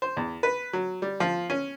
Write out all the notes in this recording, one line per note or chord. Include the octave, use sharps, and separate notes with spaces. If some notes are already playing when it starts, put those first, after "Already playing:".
C5
E2
B4
F#3
G3
F3
C#4